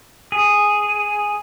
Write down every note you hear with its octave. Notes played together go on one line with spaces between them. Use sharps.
G#4